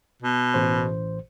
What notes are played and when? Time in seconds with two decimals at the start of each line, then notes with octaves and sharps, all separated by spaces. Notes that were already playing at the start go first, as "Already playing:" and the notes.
0.22 B2
0.54 A1 C5